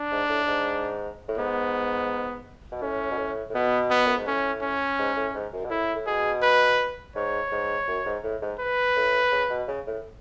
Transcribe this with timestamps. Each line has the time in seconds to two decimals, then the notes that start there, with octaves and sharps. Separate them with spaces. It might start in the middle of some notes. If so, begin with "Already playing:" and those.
Already playing: D4
0.11 G#2
0.29 A2
0.47 G#2
1.28 A2
1.38 G#2 B3
2.72 B2
2.82 A2 C#4
3.11 B2
3.18 A2
3.50 A2
3.54 B2 B3
3.90 B3
4.07 F#2
4.17 G#2
4.27 A2 C#4
4.62 C#4
4.98 G#2
5.17 A2
5.34 G#2
5.53 F#2
5.65 B2
5.71 A2 E4
5.95 A2
6.07 B2 G#4
6.43 B4
7.15 G#2 C#5
7.52 G#2
7.88 F#2
8.06 G#2
8.24 A2
8.42 G#2
8.59 B4
8.96 A2
9.32 C#3
9.50 B2
9.68 C#3
9.87 A2